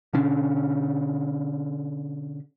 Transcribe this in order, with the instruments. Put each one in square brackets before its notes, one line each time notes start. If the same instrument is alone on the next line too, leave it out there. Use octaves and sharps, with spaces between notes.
[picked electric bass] B2 D3 C#4 D4